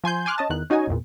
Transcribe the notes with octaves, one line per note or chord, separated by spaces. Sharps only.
F3 G#5 C6 G6
G#5 C6 D6 F6 F#6
C#4 D#5 A5
E2 D#3 F#6
C#4 D#4 F#4 D#5 G#5
G#1 E2 A#2